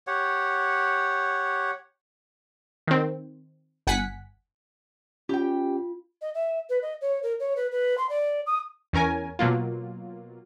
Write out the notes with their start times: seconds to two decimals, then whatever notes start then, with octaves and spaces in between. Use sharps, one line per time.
0.07 G4 C#5 F#5
2.88 D#3 C4
3.87 G1 F#5 G#5 B6 C#7
5.29 C#4 F4 G4 G5
6.22 D#5
6.34 E5
6.70 B4
6.82 D#5
7.01 C#5
7.23 A#4
7.40 C#5
7.56 B4
7.72 B4
7.98 C6
8.09 D5
8.46 D#6
8.93 E2 C#4 A#4 G#5
9.39 B2 F#3 A#3 F4